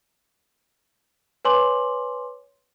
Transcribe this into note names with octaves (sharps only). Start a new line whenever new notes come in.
B4 C#5 G#5 C6 D6 F#7